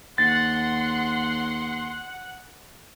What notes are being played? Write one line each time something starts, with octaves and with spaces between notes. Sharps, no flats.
D#2 F#5 C6 A6